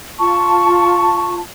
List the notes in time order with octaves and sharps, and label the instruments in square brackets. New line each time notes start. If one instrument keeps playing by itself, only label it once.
[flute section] F4 A5 [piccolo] C#6